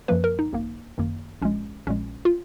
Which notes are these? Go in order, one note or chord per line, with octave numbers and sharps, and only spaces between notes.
F#2 F3 A#3 B4
A#4
D#4
G#1 F#2 D#3 A#3
G#1 F#2 D#3 A#3
A#1 A#2 G#3 C#4
A#1 A#2 G#3 C#4
F4